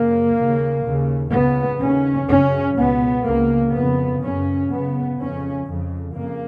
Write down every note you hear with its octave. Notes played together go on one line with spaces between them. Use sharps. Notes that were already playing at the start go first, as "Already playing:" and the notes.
Already playing: F#2 C#3 A#3
D#2 C#3
D#2 C#3
C#2 C#3 B3
D#2 C#3 C#4
F#2 C#3 C#4
C#2 B2 B3
C#2 C#3 A#3
F2 C#3 B3
F#2 C#3 C#4
F#2 C#3 B3
F2 C#3 C#4
F2 C#3
F2 C#3 A#3